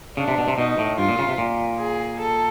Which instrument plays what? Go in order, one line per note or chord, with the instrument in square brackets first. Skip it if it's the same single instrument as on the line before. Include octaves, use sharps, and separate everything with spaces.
[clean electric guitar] C#3 [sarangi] D4
[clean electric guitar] C3
B2
C3
[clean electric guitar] B2 [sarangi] D#4
[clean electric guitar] A2
[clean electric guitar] G2 [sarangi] F4
[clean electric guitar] A#2
C#3
C3
A#2
[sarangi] G#4
A4